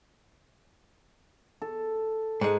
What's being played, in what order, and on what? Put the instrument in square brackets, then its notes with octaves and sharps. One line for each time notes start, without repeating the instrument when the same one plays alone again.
[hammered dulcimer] A4
[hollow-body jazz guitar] G#2 G#3